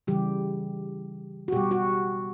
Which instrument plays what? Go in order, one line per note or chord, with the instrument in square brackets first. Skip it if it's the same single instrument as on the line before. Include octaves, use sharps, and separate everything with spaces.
[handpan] C#3 E3 G3 G4
F#4
B2 G3 G4
F#4